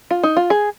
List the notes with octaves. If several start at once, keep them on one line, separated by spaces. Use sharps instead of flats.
F4
D#4
F4
G#4